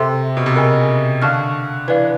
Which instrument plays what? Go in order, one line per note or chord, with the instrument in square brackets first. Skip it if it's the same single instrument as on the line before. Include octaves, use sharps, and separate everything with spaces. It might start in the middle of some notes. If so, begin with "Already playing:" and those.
Already playing: [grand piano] C3 [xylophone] A4 C5 E5 G5 C6
[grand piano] B2
C3
[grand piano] C#3 [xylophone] A#4 D#5 G#5
[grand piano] D3 [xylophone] F5 A5 C#6 F6
[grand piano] E3 [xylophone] B4 D5 F5